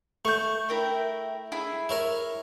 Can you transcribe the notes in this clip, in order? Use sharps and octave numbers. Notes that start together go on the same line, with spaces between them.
A3 C#6 G6
E4 A#4 G5
E4 G#4
A#4 C#5 E5